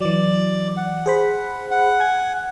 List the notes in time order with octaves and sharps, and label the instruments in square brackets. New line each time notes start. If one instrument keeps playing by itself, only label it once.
[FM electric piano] E3 F#3 [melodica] D5
[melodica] F#5
[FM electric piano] G#4 C5 B5
[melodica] F#5
[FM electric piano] G#5 G#6